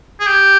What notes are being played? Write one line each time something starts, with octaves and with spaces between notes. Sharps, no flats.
G#4
G4